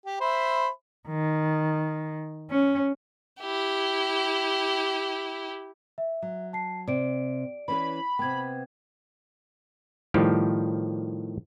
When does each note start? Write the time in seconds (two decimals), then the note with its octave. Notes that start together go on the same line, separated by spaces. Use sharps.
0.06 G4
0.20 C5 E5 B5
1.08 D#3
2.51 C#4
3.40 E4 G4
5.98 E5
6.22 F#3
6.53 A5 C7
6.88 C3 D5 D7
7.68 E3 C#4 B4 B5
8.19 C3 B3 G5 G#6
10.14 A2 D#3 F3 G3 G4